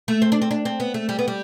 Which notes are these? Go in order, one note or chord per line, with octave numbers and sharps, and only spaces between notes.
A3
C4
D4
C4
D4
C4
B3
A3
G3
B3
G3